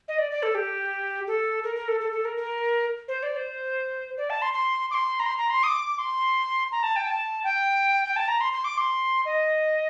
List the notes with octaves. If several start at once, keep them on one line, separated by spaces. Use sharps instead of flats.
D#5
D5
D5
A4
G4
A4
A#4
A#4
A4
A4
A4
A#4
A#4
C5
D5
C5
D5
A5
C6
C6
D6
C6
A#5
C6
A#5
C6
D#6
D6
C6
A#5
A5
G5
A5
G5
G5
A5
A#5
C6
C6
D6
C6
D#5